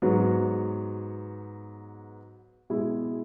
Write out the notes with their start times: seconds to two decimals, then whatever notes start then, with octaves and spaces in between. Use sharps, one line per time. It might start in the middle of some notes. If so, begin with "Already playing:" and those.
0.02 G#2 F#3 B3 F#4
2.70 B2 G#3 E4 G#4